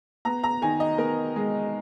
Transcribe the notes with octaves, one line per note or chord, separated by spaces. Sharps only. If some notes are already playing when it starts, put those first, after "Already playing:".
B3 A#5
A#5
D#3 G#5
D#5
B3 A#4
G#3